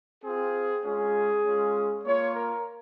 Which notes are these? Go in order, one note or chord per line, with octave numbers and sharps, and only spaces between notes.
C4 F4 G#4
G#3 C#4 F4 G#4
G#3 C#4 F4
A#3 F4 C#5
A#4